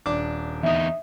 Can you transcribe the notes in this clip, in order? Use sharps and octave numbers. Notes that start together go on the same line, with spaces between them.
D#1 D4 D6
E2 D#4 E5 D#6